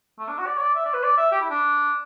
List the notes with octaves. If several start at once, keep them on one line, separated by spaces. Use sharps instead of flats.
A3
D4
F#4
D5
C#5
D5
E5
D5
B4
D5
E5
G4
E4
D4